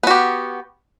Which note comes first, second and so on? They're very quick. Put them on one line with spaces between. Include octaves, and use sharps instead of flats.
B3 F#4 G4